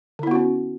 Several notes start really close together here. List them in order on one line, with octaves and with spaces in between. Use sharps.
D3 E4 B3 F#4 C#4